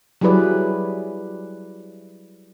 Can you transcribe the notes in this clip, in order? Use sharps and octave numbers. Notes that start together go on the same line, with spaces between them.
F#3 G3 E4 G#4 B4 D5